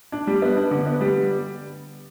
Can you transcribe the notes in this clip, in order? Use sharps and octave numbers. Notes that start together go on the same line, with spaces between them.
D4
G3
B3
D4
D3
B3
G3